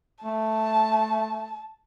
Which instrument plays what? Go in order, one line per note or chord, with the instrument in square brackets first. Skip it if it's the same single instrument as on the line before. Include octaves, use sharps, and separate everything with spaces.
[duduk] A3 [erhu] A5